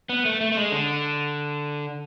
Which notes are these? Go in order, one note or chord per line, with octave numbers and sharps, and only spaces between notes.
B3
A3
A3
A3
G#3
D3